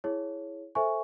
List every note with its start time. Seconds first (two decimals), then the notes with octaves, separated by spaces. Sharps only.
0.04 E4 G#4 C#5
0.75 A4 C5 E5 G#5 C#6